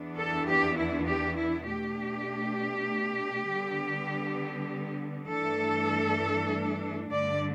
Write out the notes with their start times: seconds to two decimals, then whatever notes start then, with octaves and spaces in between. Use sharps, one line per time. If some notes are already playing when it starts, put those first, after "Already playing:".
Already playing: E2 E3 B3 D4
0.15 A4
0.45 G4
0.76 E4
1.06 G4
1.37 E4
1.67 B2 A3 D4 G4
3.48 D3 G3 B3
5.30 G2 E3 A3 D4 A4
7.12 G2 D3 A3 D4 D5